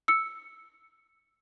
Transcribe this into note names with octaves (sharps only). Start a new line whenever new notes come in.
E6 C#7